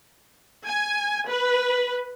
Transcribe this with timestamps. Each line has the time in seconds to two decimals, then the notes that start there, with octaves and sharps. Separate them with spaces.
0.66 G#5
1.28 B4